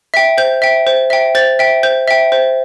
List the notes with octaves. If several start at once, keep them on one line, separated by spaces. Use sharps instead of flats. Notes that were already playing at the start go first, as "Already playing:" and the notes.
E5 G5
C5 G6
E5 G5
C5
E5 G5
C5 A6
E5 G5
C5 G6
E5 G5
C5